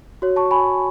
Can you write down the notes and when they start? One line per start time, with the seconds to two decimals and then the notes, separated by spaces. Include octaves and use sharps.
0.22 F#4 C#5
0.36 A5 C#6
0.51 G#5 B5